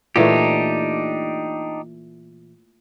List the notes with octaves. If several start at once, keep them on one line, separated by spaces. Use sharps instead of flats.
A#2 E3 A3 D4 D#4 G4